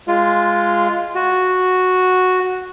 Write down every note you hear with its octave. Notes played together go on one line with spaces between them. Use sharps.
G#3 F4
F#4